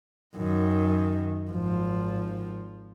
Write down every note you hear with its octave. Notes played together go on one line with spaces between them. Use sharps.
F#2 D#3
G#1 F3